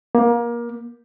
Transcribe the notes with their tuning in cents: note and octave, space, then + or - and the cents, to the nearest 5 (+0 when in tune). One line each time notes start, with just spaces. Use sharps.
A#3 +25